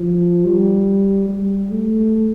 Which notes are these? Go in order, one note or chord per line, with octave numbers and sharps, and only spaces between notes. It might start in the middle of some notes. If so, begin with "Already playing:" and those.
Already playing: F3
G3
G3
A3